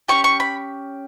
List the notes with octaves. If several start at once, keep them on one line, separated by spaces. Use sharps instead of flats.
C#4 G4 C#6
C#6
B5